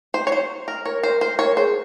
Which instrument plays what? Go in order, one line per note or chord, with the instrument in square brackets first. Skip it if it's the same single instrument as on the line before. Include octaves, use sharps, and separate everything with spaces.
[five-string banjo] C5
C#5
C5
A#4
[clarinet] A#4 [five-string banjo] C#5
[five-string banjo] C5
[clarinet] A#4 [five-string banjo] C5
[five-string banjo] C#5
[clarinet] G#4 [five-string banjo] C5